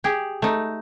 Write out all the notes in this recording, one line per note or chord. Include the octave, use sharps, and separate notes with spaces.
G4 G#4
A3 D#4